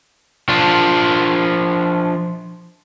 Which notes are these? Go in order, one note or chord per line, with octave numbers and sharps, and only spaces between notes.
F3 D4